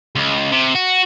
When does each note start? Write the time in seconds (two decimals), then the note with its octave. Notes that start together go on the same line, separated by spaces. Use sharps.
0.15 C#2
0.52 C3
0.75 F#4